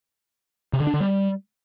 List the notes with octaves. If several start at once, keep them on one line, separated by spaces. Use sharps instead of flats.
C3
D3
D4
D3
G3